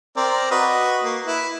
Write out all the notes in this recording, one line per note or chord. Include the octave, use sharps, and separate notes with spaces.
C4 A#4 D5
F#4 B4 D#5
A#3
E4 B4